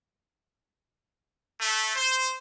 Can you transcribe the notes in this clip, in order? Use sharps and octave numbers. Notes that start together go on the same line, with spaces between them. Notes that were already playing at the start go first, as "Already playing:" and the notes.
A3
C5